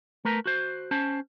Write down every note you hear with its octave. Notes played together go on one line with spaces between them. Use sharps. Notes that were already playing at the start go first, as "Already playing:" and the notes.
A3 A#4 B4 A#5
F#4 C5
C#4 C5 A5